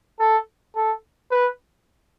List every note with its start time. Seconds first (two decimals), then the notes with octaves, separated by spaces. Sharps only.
0.20 A4
0.76 A4
1.31 B4